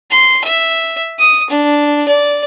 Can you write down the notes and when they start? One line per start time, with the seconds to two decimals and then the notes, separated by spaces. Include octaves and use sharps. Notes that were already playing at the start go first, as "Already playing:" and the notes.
0.11 C6
0.44 E5
1.19 D#6
1.50 D4
2.08 D5